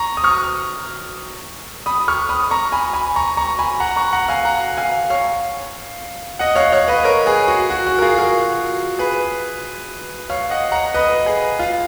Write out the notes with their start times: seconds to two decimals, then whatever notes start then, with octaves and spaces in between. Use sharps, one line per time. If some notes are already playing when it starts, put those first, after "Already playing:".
Already playing: A#5 C#6
0.17 D#6
0.24 C#6 F6
1.86 B5 D#6
2.08 C#6 F6
2.29 B5 D#6
2.51 A#5 C#6
2.72 G#5 B5
2.93 G#5 B5
3.16 A#5 C#6
3.37 A#5 C#6
3.59 G#5 B5
3.80 F#5 A#5
3.96 A#5 C#6
4.13 F#5 A#5
4.29 F5 G#5
4.45 F#5 A#5
4.77 F5 G#5
5.10 C#5 F5
6.39 D#5 F#5
6.56 C#5 F5
6.72 C#5 F5
6.88 B4 D#5
7.04 A#4 C#5
7.26 G#4 B4
7.48 F#4
7.70 F#4
7.86 F#4
7.98 A#4
8.02 F4 G#4
8.18 F#4 A#4
8.99 G#4 B4
10.30 C#5 F5
10.50 D#5 F#5
10.72 F#5 A#5
10.94 B4 D#5
11.26 G#4 B4
11.59 F4